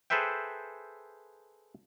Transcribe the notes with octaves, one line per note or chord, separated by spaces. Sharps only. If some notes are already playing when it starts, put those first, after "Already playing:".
G#4 A4 B4 C5 E5 G5